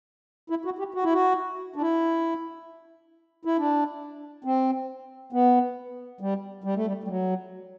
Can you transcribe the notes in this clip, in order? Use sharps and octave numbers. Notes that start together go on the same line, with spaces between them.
E4
F#4
G4
F#4
E4
F#4
D4
E4
E4
D4
C4
B3
G3
G3
A3
G3
G3
F#3